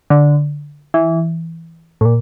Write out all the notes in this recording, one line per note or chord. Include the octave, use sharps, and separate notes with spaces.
D3
E3
A2
A#2